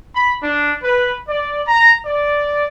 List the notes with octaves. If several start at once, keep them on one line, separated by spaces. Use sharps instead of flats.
B5
D4
B4
D5
A#5
D5